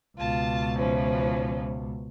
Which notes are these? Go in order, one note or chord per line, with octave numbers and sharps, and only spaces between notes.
C#2 B2 F4 A5
E3 F3 C#4